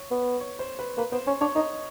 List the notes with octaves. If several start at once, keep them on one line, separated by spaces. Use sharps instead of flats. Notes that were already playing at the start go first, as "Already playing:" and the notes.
Already playing: C#5
B3
C#5
C5
B4
A#3 B4
B3 C5
C#4 C#5
D4 C#5
D#4 D#5